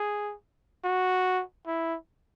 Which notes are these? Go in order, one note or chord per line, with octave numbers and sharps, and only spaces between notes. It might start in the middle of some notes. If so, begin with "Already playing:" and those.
Already playing: G#4
F#4
E4